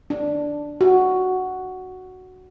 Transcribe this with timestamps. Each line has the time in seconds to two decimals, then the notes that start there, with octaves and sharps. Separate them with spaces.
0.10 D4
0.81 F#4